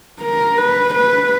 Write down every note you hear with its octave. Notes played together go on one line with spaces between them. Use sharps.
A#4
B4
B4